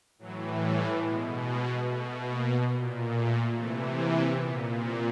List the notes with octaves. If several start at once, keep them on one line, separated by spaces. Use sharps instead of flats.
A2 E3 F#3
G3
B2 G#3
G#3
B2 A3
A#3
A#2
A3
C3 E3 A3
A#3
A#2 B3
C4